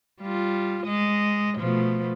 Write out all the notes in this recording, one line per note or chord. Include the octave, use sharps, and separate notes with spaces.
G3 F4
G#3 D#5
B2 F3 A3